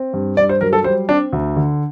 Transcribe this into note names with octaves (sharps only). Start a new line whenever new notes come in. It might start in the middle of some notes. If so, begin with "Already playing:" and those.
Already playing: C4
G2
G2 D5
C5
F#3 A#4
A4
G3 C5
C4 D4
D2
D3